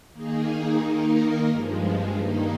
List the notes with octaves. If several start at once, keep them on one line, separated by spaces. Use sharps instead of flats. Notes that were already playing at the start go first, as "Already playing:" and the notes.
D#3 A#3 D#4 G#4
D#3 A#3 D#4 A#4
G2 F3 G#3
G2 D#3 A#3 D#4